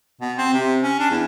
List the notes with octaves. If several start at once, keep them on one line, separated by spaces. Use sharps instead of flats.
B2
C4
C3
C#4
D4
E2